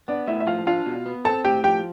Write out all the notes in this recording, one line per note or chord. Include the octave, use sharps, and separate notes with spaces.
B3 D4 D5
A2 E4 E5
E5
F3 F4 F5
D4 F4 F5
B2
B3
C4 A4 A5
A2 G4 G5
F3 G4 G5